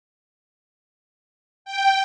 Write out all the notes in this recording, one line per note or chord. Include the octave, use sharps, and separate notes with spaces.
G5